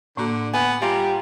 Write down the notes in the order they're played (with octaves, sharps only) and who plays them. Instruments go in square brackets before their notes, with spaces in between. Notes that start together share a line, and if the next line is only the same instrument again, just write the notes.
[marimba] A2 A#3 F#4 [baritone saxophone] D3
[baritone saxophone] B3 [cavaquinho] G#5
[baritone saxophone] G3 [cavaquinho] F4 G#5 A#5 [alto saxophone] G4